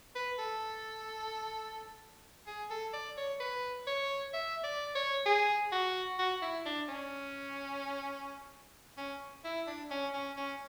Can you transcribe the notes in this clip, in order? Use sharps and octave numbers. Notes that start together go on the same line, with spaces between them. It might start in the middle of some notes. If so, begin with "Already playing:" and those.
B4
A4
G#4
A4
D5
C#5
B4
C#5
E5
D5
C#5
G#4
F#4
F#4
E4
D4
C#4
C#4
E4
D4
C#4
C#4
C#4